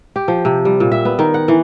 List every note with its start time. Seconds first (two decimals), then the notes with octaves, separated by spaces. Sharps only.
0.16 G4
0.28 F3
0.45 C3
0.65 G3
0.80 A#2
0.92 E5
1.05 B3
1.19 D#3
1.34 F#5
1.48 E3